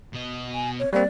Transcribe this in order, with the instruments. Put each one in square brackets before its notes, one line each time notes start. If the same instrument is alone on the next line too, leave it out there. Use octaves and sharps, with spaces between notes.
[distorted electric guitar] B2 D#5
[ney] G#5
C#5
[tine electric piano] G3 A#3 C4 [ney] D5